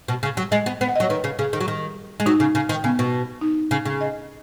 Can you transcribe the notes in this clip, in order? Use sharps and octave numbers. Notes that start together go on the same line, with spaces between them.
B2
C#3
F#3
G#3 D#5
B3
B3
F#5
D#5
F#3
C#5
D#3 B4
C#3
C#3 G#4
D#3
F#3
D#3
G#3
F#3 D#4
C#3
C#3
D#3
C#3 B3
B2
D#4
C#3
C#3
D#5